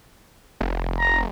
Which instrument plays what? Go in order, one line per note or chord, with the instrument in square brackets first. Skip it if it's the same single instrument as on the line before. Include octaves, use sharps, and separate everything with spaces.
[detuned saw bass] F1
[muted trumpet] A#5